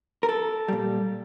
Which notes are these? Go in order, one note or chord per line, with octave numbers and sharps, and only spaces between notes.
A#4
A4
A#2 G3